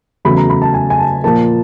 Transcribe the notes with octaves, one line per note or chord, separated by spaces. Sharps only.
E2 C#3 F#3 A3 B5
A#5
B5
A5
G#5
G#5
A5
A#2 F3 A#3 A5